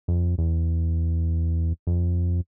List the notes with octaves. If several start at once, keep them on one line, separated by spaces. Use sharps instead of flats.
F2
E2
F2